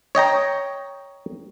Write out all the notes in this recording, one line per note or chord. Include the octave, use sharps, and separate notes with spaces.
C#5 D#5 G5 A#5